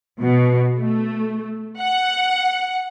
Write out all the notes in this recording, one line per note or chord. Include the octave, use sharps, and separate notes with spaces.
B2
A3
F#5